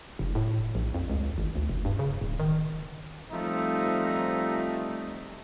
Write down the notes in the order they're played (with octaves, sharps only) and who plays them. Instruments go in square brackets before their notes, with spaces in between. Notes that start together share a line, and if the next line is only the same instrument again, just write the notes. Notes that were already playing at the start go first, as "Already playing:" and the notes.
[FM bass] F1
A2
A#1
F2
C#2
G#1
D2
F1
G2
C#3
D1
D#3
[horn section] F3 G3 A3 C4 D#4